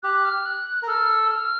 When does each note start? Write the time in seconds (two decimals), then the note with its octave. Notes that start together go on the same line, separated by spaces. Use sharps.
0.03 G4 F#6
0.25 F6
0.45 F#6
0.83 A#4
0.87 A4 F6
1.10 E6
1.31 F6